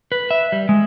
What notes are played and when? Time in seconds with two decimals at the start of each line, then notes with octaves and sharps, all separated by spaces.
0.12 B4
0.31 E5
0.52 G3
0.69 G#3